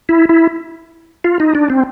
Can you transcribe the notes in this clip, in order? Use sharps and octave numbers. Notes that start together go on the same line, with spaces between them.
E4
E4
F4
D#4
D4
C4